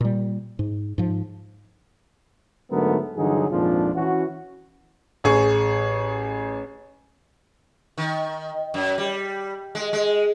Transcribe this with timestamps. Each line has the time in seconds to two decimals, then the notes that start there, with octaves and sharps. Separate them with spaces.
0.01 A#2 G3
0.59 G#2
0.98 G#2 F3
2.71 G#2 D3 F#3 A3 B3 A#4
3.16 G2 D3 E3 F#3 D#4 G#4
3.50 G#1 F2 A#2 F3 D4 F4
3.94 E3 C#4 F#4
5.24 A1 G#4 C#6
7.98 D#3
8.74 F#2
8.98 G3
9.75 G#3
9.93 G#3